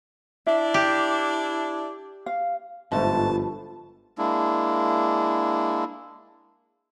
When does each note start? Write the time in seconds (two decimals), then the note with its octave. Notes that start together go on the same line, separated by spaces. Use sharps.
0.47 D4 E4 E5
0.74 G4
2.26 F5
2.92 G1 G#2 F3 A3 B4 A5
4.18 G#3 A#3 D4 E4